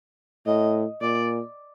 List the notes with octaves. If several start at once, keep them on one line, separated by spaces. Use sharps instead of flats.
A2 D#5
A#2 D5